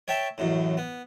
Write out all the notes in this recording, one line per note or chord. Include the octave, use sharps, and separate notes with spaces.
C#5 E5 G5 A5
A1 F#2 A2
B3